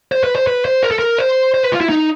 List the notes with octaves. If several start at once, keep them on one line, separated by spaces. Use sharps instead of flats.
C5
B4
C5
B4
C5
A#4
A4
A#4
C5
C5
B4
F4
E4
D#4